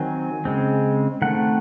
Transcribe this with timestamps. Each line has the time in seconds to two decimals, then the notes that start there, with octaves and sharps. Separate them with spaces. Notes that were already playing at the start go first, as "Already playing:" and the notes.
Already playing: D#3 F#3 C4 G#5
0.45 C#3 G#3 C4
1.22 D#3 A3 C4 F#5